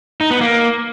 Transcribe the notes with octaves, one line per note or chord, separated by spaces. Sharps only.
D#4
B3
A#3